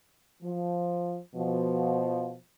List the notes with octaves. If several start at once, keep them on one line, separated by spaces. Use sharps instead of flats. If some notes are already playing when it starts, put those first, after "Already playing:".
F3
B2 F3